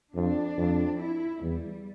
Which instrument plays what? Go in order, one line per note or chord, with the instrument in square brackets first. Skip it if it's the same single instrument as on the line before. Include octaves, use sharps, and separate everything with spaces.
[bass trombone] F2 [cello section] D4
[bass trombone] F2
[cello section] E4
[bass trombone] E2 [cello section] G3